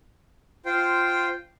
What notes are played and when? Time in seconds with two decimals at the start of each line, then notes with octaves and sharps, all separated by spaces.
0.66 F4 C5 G5